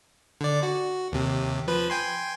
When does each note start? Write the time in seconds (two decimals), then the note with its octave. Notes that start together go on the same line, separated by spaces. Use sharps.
0.41 D3 D5
0.63 F#4
1.12 D#2 C3
1.68 F3 B4
1.90 G5 G#5 C6